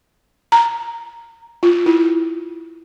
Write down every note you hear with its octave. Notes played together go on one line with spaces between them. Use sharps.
A#5
F4
E4